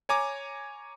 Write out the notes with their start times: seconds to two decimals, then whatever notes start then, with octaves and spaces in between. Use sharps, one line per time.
0.09 C#5 G#5 A#5 D6